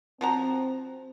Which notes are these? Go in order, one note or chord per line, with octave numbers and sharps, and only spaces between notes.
F3 C4 F#4 A#5